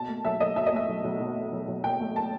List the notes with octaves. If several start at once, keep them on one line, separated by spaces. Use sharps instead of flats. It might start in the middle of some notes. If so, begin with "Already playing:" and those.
Already playing: B2 A5
A3
B1 E5
B1 D#5
B2 E5
D#5
A3 E5
B1
B1
B2
A3
B1
B1
B2 G5
A3
A5